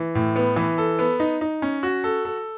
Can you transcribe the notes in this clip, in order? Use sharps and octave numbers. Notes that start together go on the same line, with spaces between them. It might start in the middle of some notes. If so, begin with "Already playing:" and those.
Already playing: E3
A2
B3
E3
A4
B3
D#4
D#4
C#4
F#4
A4
A4